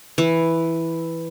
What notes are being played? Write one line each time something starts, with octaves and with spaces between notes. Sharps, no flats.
E3